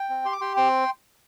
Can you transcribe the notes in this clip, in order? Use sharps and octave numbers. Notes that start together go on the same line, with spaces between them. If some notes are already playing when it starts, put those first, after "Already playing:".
Already playing: G5
C4
G4 C6
D6
G4 G5 C6
C4 G5 C6